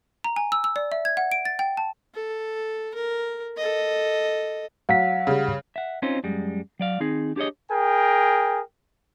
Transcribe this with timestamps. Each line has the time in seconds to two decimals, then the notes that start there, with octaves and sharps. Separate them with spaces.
0.24 A#5
0.36 G#5
0.52 E6
0.64 E6
0.76 D5
0.92 E5
1.05 G#6
1.17 F#5
1.32 D7
1.45 A6
1.59 G5
1.77 A5
2.14 A4
2.94 A#4
3.57 A4 D#5
4.89 F#3 F5 F#5 B6
5.27 C#3 G3
5.76 E5 F#5
6.02 C4 C#4 D#4 F4 C5
6.24 F#2 G3 G#3
6.80 F#3 D5 F5
7.00 D#3 C4 D#4 G#4
7.36 D4 G4 G#4 C#5 D#5
7.71 G#4 A#4 G5